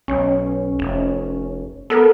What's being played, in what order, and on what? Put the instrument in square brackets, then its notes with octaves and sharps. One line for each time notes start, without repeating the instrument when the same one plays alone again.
[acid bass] B1 [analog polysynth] C#4
[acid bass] F1
[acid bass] B3 [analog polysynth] A4 A#4